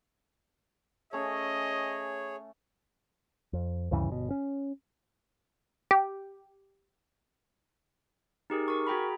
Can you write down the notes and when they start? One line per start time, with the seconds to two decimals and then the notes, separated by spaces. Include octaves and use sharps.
1.13 A3 C#4 G#4 C#5 D#5
3.53 F2
3.91 D2 G2 C#3 E3
4.09 G1 B2
4.31 C#4
5.91 G4
8.50 D#4 G4 G#4 A#4
8.68 A#4 C#6
8.87 F#4 G#4 G5 A#5 B5